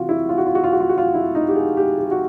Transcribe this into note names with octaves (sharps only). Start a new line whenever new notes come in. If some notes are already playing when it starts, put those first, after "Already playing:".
Already playing: C3 E3 F4 F#4
E4
F4
F#4
F4
F#4
F4
F#4
F4
F#4
F4
E4
D#4
G4
G#4
G4
G4
F#4